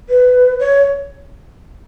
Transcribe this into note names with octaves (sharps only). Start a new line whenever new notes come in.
B4
C#5